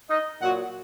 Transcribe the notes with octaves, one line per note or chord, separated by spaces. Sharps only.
D#4 D#5
A#2 F#3 F#4 F#5